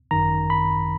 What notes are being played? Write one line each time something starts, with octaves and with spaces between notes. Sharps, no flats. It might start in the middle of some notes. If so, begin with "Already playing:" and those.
G#1 F#2 D#3 A#5
B5